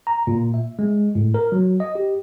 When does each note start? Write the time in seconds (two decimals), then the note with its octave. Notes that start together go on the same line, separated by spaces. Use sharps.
0.07 A#5
0.27 A#2
0.54 E5
0.79 G#3
1.15 A2
1.34 A#4
1.52 F#3
1.80 D#5
1.95 G4